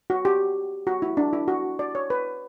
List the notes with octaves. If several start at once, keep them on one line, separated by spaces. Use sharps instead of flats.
F#4
G4
F#4
E4
D4
E4
F#4
D5
C#5
B4